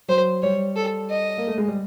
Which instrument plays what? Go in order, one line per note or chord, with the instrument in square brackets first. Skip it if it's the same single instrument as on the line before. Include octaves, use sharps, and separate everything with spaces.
[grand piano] F#3 [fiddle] C5
[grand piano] G3 [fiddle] C#5
[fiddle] A4
D#5
[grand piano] A#3
A3
G#3
G3